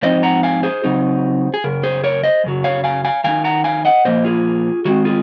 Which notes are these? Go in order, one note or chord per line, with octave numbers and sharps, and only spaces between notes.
G#2 F3 C4 D#4 C5 D#5
F#5 A#5
F5 G#5
G#4 C5
C#3 F#3 C4 D#4
G#4
F#2 C#3 A#4
G#4 C5
A#4 C#5
C5 D#5
F#2 C#3 F#3
C#5 F5
F5 G#5
F5 G#5
D#3 G#3 D#4 F5 G#5
F#5 A#5
F5 G#5
D#5 F#5
A#2 F3 A#3 C5 D#5
F4 G#4
D#3 G#3 C4 F#4
F4 G#4